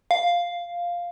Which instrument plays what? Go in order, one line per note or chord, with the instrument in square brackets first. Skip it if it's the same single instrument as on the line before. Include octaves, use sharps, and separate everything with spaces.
[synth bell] F5